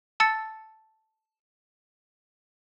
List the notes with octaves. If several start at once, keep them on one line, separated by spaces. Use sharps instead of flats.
A5 E6 A6 C#7